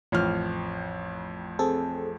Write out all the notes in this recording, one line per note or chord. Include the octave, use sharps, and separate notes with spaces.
A1 F2 F6
C4 G#4 A4